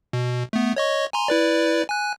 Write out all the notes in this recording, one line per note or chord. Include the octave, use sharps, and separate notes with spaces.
B2
A3 B3
C#5 D#5 C#6
G#5 A#5 C6
E4 B4 D5
G#5 F#6